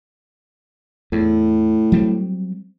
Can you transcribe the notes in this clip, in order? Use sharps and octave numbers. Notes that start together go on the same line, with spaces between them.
E2 A2
F#3 G3 C4